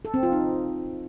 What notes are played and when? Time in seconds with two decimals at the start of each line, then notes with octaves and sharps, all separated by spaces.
0.05 A4
0.14 C4
0.23 F4
0.32 D#4